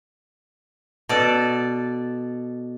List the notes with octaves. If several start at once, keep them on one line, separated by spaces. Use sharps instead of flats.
B2 A4 D5